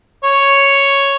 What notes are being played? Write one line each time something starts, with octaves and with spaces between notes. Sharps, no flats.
C#5